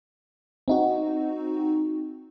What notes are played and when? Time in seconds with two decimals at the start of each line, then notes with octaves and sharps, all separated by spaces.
0.68 C4 D#4 F#4